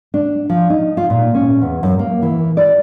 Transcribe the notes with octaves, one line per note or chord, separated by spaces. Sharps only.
D4
F3
D#4
F4
A#2
C#4
E2
F#2
A#3
E3
D5